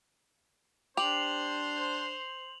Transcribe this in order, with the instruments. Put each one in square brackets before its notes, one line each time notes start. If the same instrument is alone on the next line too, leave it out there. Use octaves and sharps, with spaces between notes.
[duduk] D4 [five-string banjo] G4 [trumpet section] C5 C6 [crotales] F7 F#7